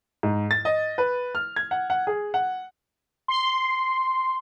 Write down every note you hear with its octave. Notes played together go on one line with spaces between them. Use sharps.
G#2
A6
D#5
B4
F6
G#6
F#5
F#5
G#4
F#5
C6